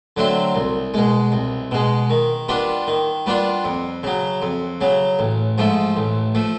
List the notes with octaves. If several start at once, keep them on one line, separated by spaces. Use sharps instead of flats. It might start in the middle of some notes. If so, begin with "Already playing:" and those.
D3 F#3 A3 C4
C2
B2 G#3
C2
B2 G#3
D#3
G3 B3 D4 F4
D#3
G3 B3 D4 F4
F2
C#3 F#3
F2
C#3 F#3
A1
G#2 F3 A3
A1
F3 A3